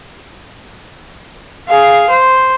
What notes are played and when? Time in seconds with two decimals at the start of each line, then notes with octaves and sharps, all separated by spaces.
1.68 G#4 F5
2.09 C5